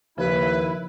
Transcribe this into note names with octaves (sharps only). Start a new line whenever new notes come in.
D#2 C#3 F3 E4 B4